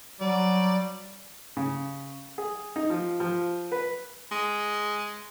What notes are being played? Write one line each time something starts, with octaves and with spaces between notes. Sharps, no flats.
F#3 G3 D5
C#3
G#4
D#4
F3
F3
B4
G#3